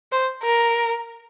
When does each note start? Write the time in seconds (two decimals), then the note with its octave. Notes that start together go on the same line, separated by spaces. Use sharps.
0.12 C5
0.43 A#4